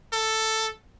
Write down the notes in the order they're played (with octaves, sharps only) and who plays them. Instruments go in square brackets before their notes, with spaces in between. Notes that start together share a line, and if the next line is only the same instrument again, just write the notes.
[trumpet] A4